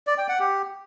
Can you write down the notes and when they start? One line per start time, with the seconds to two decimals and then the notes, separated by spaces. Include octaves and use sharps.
0.07 D5
0.18 G5
0.29 F#5
0.40 G4